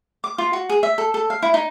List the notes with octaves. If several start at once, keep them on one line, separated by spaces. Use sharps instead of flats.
D6
F4
F#4
G#4
E5
A4
A4
F5
E4
D#4